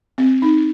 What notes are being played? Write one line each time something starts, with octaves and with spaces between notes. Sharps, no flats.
C4
D#4